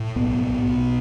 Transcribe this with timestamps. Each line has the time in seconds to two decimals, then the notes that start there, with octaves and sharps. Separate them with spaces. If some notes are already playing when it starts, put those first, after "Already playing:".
Already playing: A2
0.16 B1 B3
0.40 A2 B3
0.66 B1